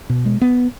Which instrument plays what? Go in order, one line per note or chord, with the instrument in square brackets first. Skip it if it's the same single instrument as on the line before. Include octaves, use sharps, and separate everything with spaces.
[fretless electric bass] B2
G#3
B3